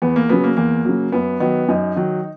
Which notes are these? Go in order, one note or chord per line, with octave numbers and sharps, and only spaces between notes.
E2 B3
A#3
C#3 F#3 B3
A#3
E2 A#3
C#3 F#3
F#2 B3
D#3 F#3 B3
F#2 D#4
D#3 F#3